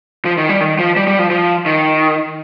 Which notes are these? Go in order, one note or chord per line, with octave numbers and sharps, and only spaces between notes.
F3
D#3
G3
D#3
F3
G3
G3
F3
F3
D#3